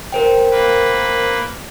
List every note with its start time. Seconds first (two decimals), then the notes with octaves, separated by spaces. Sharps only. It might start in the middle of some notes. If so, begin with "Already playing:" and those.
0.12 A#4 C5 G5
0.51 A#3 B4